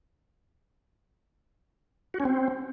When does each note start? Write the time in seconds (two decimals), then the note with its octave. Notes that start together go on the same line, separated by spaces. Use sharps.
2.14 F#4
2.20 C#4
2.25 C4